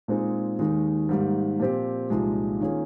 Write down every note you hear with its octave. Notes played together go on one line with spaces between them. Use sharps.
A#2 G#3 C4 D#4 G#4
D#2 D#3 G#3 D#4
G#2 D#3 G3 A#3
A#2 F3 C4 G4
C2 A#2 F3 G#3 D#4
D#3 A#3 C#4 F4 G#4